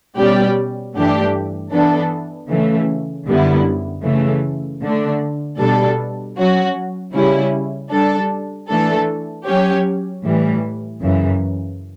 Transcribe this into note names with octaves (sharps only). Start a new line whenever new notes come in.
B2 G3 C#4 G4 D5
G2 E3 A3 D4 G4
E3 B3 D4 A4
C#3 E3 A3
F#2 D3 G3 B3 E4
C#3 E3 A3
D3 A3 D4
B2 G3 D4 A4
F#3 C#4 F#4
C#3 G3 C#4 E4
G3 D4 A4
E3 A3 D4 A4
F#3 C#4 G4 C#5
A2 E3 G3
F#2 C#3 E3